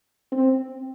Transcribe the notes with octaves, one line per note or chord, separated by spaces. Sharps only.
C4